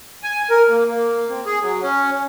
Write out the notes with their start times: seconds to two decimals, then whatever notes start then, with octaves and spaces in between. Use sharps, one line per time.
0.23 G#5
0.50 A#4
0.69 A#3
0.88 A#3
1.30 C4
1.46 G#4
1.62 F#3
1.81 C#4